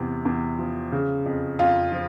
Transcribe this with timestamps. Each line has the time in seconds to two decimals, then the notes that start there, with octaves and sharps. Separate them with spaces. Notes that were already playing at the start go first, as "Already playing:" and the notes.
Already playing: E2 C3
0.25 E2
0.58 F3
0.92 C#3
1.26 F2
1.59 F2 F4
1.92 F3